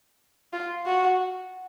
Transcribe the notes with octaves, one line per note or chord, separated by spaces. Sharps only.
F4
F#4